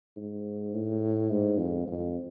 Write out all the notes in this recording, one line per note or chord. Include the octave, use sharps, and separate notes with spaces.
G#2
A2
G#2
F2
F2